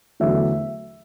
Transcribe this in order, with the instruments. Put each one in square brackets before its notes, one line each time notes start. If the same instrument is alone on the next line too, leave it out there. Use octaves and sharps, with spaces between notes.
[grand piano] E2 D3 F#3 A3 E5